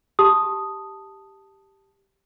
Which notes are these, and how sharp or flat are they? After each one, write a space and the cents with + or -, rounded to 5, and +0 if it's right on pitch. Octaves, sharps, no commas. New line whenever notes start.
G4 +0 A5 +0 D#6 -5